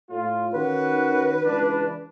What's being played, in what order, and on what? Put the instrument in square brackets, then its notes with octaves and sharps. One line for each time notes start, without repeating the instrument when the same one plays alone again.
[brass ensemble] A2 F4
[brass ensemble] D#3 C#4 F#4 [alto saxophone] B4
[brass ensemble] C#2 E3 D4